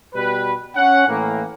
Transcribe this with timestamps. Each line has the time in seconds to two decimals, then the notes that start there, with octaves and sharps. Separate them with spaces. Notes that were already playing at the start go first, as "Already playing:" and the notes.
0.14 B2 G3 B4
0.76 C#4 F#5
1.08 A2 E3 A#3